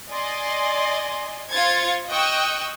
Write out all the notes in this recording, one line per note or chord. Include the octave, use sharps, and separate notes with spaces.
D5 D#5 G#5 C6
F4 C5 G#6 A6 C#7
D#5 G5 C#6 D#6 E6 F#6